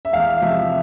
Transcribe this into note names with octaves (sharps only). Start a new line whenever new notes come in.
E5
E2 F5
C3 F3 E5